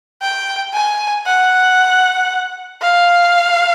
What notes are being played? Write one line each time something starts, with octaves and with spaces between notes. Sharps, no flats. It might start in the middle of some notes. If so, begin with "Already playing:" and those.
G5
G#5
F#5
F5